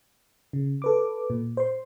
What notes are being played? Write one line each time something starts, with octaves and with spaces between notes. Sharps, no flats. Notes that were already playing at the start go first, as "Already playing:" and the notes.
C#3
A4 B4 D6
A#2
C5 C6